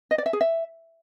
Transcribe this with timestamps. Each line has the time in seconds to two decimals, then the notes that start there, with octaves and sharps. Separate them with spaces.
0.11 D#5
0.18 D5
0.26 E5
0.33 G#4
0.41 E5